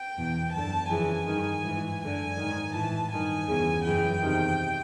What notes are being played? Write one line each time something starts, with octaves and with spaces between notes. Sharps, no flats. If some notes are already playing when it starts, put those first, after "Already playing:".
Already playing: G5
E2 B2
F#2 D3 A5
F2 C#3 E3 G#5
G2 D#3
G#2 E3
F#2 D3 G#5
G#2 D#3
A2 E3 A5
G2 D#3 G#5
E2 C#3 E3
F#2 C#3 E3 G5
E2 C3 D#3